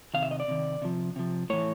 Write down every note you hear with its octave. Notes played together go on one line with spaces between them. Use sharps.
C3 D#3 F5
E5
D#5
D5
C3 D#3
C3 F3
C3 F3
A2 E3 C#5